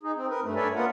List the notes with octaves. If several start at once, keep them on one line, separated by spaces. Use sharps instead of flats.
D#4 G#4
C4
A#4 B4
G2 A3
A4 B4 C#5 D5 E5 G#5
A#3 B3 F4 A#4 B4 F#5